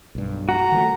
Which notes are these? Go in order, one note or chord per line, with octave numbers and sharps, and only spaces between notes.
B1 G2
F#4 A#5
D#3 F3 A3